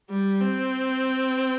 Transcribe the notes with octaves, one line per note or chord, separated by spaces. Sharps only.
G3
C4